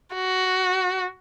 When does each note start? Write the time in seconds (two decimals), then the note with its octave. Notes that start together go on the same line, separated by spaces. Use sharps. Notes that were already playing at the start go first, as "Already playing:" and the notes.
0.15 F#4